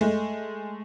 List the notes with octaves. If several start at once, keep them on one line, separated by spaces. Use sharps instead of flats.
G#3 A3